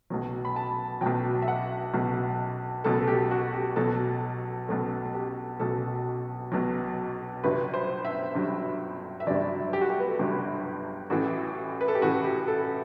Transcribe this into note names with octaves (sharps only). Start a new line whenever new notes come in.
B1 B2 F#3
B5
A5
B1 B2 F#3 G5
E5
F#5
B1 B2 F#3
B1 B2 F#3 A4
A4
G4
F#4
G4
B1 B2 F#3 A4
B1 B2 F#3 A4
G4
B1 B2 F#3 A4
B1 B2 F#3
G1 G2 F#3 B4
C5
E5
G1 G2 F#3
E5
G1 G2 F#3 D5
G4
F#4
G4
B4
A4
G1 G2 F#3 G4
A1 A2 E3 F#4
B4
A4
G4
A1 A2 E3 F#4
G4
A4